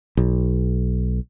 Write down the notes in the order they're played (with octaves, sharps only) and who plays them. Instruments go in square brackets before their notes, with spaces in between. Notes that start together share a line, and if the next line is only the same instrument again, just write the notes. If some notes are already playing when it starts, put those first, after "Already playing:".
[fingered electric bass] B1